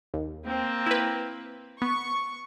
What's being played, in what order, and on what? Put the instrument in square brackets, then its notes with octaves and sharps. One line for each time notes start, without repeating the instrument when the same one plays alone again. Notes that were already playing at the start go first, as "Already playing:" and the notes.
[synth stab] D#2
[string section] A#3 C4
[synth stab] E4 B4
[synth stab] B3 [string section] C#6